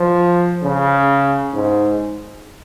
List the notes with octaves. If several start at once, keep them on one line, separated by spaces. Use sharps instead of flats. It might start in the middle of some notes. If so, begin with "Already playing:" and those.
Already playing: F3
C#3
G#2